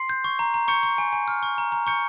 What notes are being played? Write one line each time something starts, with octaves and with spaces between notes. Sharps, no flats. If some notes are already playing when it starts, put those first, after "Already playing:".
Already playing: C6 C7
G6
C#6
A#5
A#5
C#6 G6 C#7
C#6
G#5
G#5
F6
C#6
A#5
A#5
C#6 G6 C#7